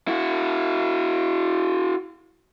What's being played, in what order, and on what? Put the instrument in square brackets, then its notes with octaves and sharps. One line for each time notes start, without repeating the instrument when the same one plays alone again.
[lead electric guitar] E4 F#4